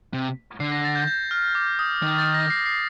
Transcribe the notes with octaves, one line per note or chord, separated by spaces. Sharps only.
C3
D3 C7
A#6
A6
G6
G6
F6
D6
D#6
D#3
A6
A#6
C7
C7